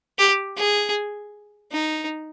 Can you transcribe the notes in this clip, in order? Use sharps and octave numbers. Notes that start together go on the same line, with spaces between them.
G4
G#4
D#4